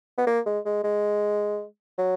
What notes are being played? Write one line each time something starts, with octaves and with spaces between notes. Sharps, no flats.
B3
A#3
G#3
G#3
G#3
F#3